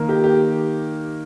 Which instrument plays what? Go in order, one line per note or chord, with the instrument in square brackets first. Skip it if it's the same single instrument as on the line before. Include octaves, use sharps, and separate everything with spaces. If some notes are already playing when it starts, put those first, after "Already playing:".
Already playing: [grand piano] D#3 A#3 D#4 A#4
[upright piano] G4
G4